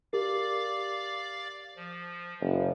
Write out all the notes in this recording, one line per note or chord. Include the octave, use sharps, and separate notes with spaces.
G4 A#4 D5 F5 D6
F3
F#1